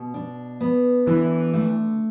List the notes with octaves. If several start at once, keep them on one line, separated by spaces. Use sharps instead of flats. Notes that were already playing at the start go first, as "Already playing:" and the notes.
Already playing: B2
D4
B3
D3 E3
A3